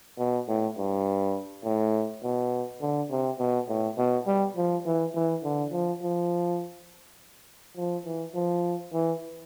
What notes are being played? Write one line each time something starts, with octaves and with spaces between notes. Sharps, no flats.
B2
A2
G2
A2
B2
D3
C3
B2
A2
B2
G3
F3
E3
E3
D3
F3
F3
F3
E3
F3
E3